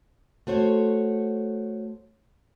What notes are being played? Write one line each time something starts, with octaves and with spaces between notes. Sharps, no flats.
A3 F#4 C5 C#5